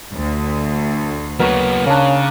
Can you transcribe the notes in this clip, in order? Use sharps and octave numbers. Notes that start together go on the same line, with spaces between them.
D2
F#3 A#3 B3 A#4 C#5
C#3 A#3 C#4 D4